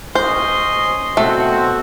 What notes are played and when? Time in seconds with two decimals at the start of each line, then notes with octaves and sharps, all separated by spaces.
0.15 C#4 C5 D#5 C6
1.17 B2 A3 C4 F#4